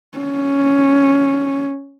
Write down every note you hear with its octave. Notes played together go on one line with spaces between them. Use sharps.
C#4